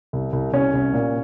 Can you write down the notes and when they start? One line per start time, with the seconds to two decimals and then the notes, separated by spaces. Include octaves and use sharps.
0.13 C2
0.33 C2
0.53 C2 C#4
0.73 C2
0.93 A#2